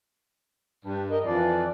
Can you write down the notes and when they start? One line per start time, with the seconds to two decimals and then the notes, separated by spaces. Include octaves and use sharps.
0.85 G2
1.10 A#4 D#5
1.24 F2 E3 D5